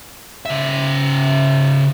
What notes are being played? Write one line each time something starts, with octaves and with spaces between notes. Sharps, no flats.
C#3 E5